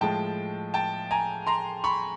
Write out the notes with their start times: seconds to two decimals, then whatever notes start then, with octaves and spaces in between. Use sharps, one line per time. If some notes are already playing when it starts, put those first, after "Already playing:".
0.01 A2 F3 G#3 G5 A5
0.74 G5 A5
1.11 G#5 A#5
1.47 A#5 C6
1.84 B5 C#6